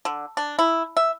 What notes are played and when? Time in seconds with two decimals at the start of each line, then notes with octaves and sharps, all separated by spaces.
0.05 D3
0.37 D4
0.59 E4
0.97 E5